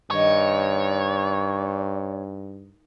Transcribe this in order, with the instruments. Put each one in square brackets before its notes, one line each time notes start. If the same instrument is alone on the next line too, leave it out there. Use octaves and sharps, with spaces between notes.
[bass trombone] G2 [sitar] D#3 [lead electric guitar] C#5